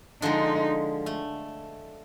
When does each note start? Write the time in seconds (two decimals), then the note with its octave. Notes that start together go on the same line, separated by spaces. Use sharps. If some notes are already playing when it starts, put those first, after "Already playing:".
0.22 D3 F3 G#3 D#4
1.06 A3